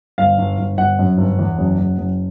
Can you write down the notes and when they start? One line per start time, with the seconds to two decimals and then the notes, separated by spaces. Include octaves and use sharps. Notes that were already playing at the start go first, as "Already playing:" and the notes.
0.18 G1 F5
0.38 G1
0.58 G1
0.78 G1 F#5
0.99 F#2
1.18 G1
1.39 E2
1.58 F#1
1.78 F#1
1.98 F#1